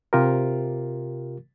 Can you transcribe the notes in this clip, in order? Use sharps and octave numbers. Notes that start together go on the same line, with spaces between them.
C3 F4 G4 A#4